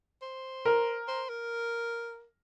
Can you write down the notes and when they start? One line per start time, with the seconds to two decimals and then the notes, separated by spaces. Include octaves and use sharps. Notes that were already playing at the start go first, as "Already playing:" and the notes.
0.22 C5
0.65 A#4
1.08 C5
1.29 A#4